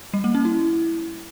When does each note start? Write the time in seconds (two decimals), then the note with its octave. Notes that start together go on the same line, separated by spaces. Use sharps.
0.14 G3
0.24 A#3
0.34 C#4
0.45 E4